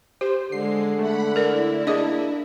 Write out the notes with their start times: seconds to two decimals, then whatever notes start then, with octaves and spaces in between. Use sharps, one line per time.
0.21 G4 C5
0.52 D3 G#3 C7
0.99 A3 F#5 B5
1.36 E4 A#4 D5
1.87 A#3 D4 G#4 D5 D#5